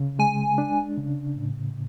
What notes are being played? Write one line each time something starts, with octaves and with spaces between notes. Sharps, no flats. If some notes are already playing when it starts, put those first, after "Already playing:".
Already playing: C#3
G#3 G#5
D4
C#3
A2